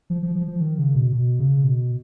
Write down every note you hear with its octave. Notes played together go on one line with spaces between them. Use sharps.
F3
F3
F3
F3
D#3
C#3
B2
B2
C#3
B2